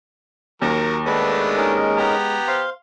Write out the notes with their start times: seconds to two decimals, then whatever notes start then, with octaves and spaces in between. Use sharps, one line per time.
0.62 D#2 F#3 A#4
1.06 G#3 A3 B3 D4 B4
1.57 C#4 D#4 A#4
1.97 B3 G4 A#5
2.48 C5 F5 C6